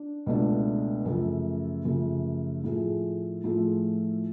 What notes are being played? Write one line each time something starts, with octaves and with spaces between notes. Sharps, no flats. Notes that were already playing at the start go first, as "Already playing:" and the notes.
Already playing: D4
C#2 B2 A3 D4
F#2 C#3 F3 A3
F#2 C#3 F3 A3
A2 F3 A3 F4 G#4
A2 F3 A3 F4 G#4